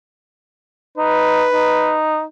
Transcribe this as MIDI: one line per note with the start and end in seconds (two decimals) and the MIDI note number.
0.98 1.45 63
0.98 2.00 71
1.53 2.23 63